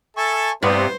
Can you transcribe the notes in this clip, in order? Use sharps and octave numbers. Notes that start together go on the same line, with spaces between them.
A4 E5 G#5 A5 C#6
G2 C3 B3 C5 D5